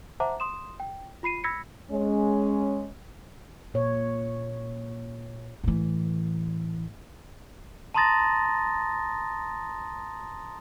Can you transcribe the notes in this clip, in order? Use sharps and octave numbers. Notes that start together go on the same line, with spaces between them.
C5 E5 F#5 A5 A#5 D6
C6 D#6 E7
G5
F4 B5 C7 D#7
B5 E6 G#6 A#6 B6 C#7
G#3 C#4
A#2 C#5
A2 E3
A5 A#5 C6 D#6 A6 A#6